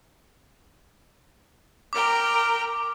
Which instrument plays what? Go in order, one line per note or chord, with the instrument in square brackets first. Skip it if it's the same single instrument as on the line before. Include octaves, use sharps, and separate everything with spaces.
[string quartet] A#4 G5 A#5 [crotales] D6